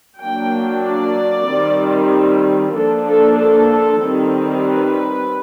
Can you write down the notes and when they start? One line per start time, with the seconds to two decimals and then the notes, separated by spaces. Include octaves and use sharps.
0.20 F#3 A#3 D4 G5
0.84 D5
1.48 D#3 G3 C4
2.75 F3 A#3 D4 A4
3.07 A4
3.39 A4
4.02 D#3 G3 C4
4.66 B4